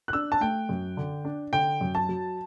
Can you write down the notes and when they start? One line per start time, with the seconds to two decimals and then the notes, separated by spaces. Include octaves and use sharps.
0.08 F#6
0.13 D4 E6
0.32 A5
0.41 A3 G5
0.69 F#2
0.97 D3
1.25 D4
1.53 D3 G5
1.81 F#2
1.95 A5
2.09 F#3